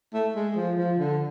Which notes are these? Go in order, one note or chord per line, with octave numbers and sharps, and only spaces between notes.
A3
G#3
F3
F3
D3